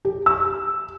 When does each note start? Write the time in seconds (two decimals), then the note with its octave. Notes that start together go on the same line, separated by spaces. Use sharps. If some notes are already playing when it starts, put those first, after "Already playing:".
0.05 G4
0.26 E6